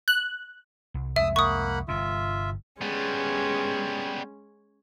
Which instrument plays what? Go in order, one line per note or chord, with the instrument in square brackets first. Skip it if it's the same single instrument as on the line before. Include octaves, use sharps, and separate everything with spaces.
[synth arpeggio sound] F#6
[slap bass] C2
[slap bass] C2 F2 G#3 [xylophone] E5 [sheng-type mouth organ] D#6 E6
[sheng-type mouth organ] A#3 F#5 B5 [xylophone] C#6 D#6
[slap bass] G1 G2 C3 [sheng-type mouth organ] F4 E5
[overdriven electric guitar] G3 B3 [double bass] G#3 [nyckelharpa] C#4